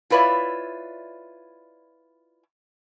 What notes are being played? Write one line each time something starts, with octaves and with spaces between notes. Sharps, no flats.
E4 F4 B4 C#5 D5 E5